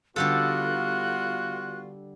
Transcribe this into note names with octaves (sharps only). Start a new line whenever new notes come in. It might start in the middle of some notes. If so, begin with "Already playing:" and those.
D3 G3 B3 F4 F#4 A4 F#6